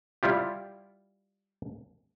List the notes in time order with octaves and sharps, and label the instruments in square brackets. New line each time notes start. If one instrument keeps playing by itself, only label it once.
[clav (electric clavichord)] G3 E4 F4 G4